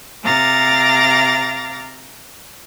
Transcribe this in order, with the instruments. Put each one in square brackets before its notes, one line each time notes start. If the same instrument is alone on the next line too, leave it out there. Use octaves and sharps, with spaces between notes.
[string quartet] C3 F5 A#5 D6 A6